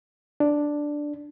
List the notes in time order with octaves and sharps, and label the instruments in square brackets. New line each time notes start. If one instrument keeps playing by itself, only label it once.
[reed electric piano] D4